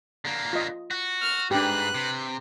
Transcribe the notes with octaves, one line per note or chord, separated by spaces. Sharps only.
D3 A#3
F4 D#5
F#4
F6
G#2 D4 G4 B4 F#6
C3